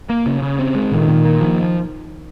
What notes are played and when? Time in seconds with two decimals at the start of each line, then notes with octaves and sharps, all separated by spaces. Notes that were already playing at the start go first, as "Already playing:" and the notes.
0.09 A#3
0.26 C#3
0.42 C#3
0.59 C4
0.75 G#3
0.92 A#2 D#3
1.08 A#2
1.24 A#3
1.41 F3